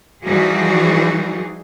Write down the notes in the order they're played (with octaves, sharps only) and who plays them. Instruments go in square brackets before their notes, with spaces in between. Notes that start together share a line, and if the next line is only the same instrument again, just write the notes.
[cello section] E3 F3 G3 D#4 F#4 G#4